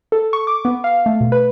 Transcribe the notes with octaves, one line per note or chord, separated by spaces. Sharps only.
A4
C#6
D6
B3
F5
A3
B2
B4